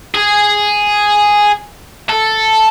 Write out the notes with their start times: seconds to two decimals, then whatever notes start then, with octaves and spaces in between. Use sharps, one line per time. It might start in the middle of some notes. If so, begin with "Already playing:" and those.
0.15 G#4
2.09 A4